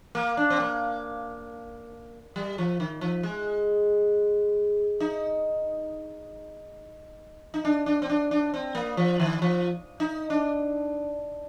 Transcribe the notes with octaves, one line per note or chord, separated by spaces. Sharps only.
A#3
D4
C4
A#3
G3
F3
D#3
F3
G#3
D#4
D#4
D4
D4
C4
D4
D4
C4
A#3
F3
D#3
F3
D#4
D4